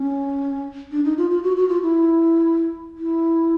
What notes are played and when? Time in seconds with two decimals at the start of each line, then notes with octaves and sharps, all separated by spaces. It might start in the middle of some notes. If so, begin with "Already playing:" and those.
Already playing: C#4
0.92 D4
1.05 D#4
1.17 F4
1.31 F4
1.44 F#4
1.57 F#4
1.69 F4
1.82 E4
2.98 E4